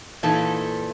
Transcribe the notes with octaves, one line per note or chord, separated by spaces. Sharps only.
A#2 E3 A3 D#4 A4